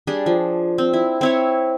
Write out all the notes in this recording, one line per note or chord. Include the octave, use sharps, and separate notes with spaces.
G3 D4 G#4
F3
C4
E4
C4 E4 C#5